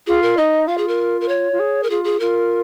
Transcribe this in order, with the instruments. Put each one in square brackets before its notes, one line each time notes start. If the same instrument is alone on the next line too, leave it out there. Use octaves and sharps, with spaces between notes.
[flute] F4 [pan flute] G#4
[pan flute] A#4
[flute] D#4 [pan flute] D#5
[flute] F4 [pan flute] F5
[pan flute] G#4
A#4
A#4
C#5
[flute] F4
G#4
[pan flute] A#4
[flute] F4 [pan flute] G#4
[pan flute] G#4
[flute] F4 [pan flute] A#4